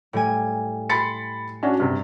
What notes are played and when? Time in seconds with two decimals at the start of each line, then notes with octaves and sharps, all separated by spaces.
0.13 A2 G3 G#5
0.89 B5 C6 A6 C#7
1.63 C#4 D4 F#4
1.80 G2 C3